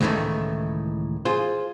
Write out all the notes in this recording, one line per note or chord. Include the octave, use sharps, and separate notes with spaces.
C#2 A2 D#3 E3 A3
F4 G#4 C5